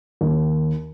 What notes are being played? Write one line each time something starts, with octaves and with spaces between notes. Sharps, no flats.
D#2